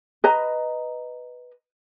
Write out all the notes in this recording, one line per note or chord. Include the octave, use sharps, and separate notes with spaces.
B4 D#5 A#5